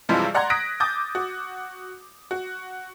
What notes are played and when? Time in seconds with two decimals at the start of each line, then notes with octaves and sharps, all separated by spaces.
0.09 G2 C3 E3 F3 G3 G#3
0.35 D5 F#5 A#5 C6 F#6 G#6
0.50 D#6 F#6 A#6 B6 D7
0.80 D6 D#6 G6 A6
1.15 F#4
2.31 F#4